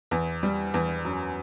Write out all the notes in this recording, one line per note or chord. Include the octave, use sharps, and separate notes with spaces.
E2
G3
E2
F#2